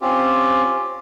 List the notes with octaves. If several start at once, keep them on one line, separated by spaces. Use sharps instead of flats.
C4 C#4 F4 G4